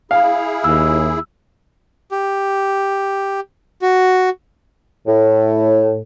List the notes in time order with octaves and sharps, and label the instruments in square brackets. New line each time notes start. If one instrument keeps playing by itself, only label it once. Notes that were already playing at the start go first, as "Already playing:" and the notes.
[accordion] E4 G#4 [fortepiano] F5
[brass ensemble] D#2 [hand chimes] E6
[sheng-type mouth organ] G4
F#4
[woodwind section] A2